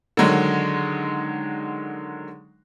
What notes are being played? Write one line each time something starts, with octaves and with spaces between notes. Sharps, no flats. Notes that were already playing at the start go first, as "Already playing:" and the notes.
D3 D#3 F#3 G#3